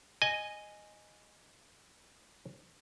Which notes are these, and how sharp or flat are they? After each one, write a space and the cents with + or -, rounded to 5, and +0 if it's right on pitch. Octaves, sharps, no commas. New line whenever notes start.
D#5 -10 G#5 +0